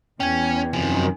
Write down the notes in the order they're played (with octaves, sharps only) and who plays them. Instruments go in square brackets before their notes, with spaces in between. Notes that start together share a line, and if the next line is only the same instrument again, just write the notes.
[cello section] E2 [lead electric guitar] C#4 [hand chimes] G5 G#6
[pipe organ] F#2 D#3 [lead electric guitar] C3 F3 [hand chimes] G#5